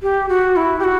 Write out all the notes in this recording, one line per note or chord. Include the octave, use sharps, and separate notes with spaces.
G4
F#4
E4
G4
F#4